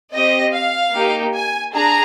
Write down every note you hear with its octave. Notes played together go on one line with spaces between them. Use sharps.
C4 G4 D#5
F5
A#3 D#4 G4
G#5
D4 G#4 A#5